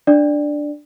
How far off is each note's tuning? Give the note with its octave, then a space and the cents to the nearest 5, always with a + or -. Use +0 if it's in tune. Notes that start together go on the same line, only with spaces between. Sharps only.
D4 +0 D5 +10